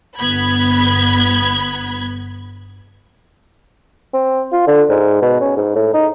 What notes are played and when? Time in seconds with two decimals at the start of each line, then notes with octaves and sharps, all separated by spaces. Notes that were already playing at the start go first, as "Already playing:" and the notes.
0.19 G1 B3 B5 G#6
4.13 C4
4.52 F4
4.67 D3
4.89 G#2
5.22 B2
5.41 C#4
5.57 G#2
5.75 A2
5.94 D#4